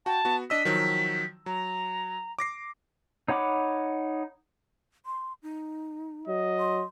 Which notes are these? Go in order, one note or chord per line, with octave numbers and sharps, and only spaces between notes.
F#4 G5 A5
B3 F#4
D4 D#5 E6 B6
D#3 F3 F#3
F#3 A#5
D6 A#6 C7
D#4 C#5 F#5 B5 D6
C6
D#4
F#3 D#5
C6